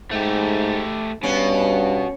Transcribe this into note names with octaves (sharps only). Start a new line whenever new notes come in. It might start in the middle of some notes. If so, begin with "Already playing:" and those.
G#2 A3 G4
G2 B2 C#4